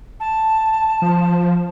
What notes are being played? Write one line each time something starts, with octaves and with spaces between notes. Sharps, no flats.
A5
F3